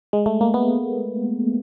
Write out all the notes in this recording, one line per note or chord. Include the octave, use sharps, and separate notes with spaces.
G#3
A3
A#3
B3